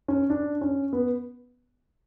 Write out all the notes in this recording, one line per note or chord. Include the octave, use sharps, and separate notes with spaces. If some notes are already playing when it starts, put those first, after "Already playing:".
C#4
D4
C#4
B3